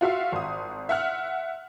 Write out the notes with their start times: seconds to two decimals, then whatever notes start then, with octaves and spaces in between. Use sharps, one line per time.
0.01 F4 F#4 E5 F5
0.32 G#1 D#6
0.89 E5 F#5 F6